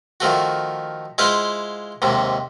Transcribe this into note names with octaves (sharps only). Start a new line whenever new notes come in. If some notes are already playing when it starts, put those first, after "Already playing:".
D#3 F3 A3 F#4
G#3 E4 F4 C5 F5 F#5
D#2 G#2 C3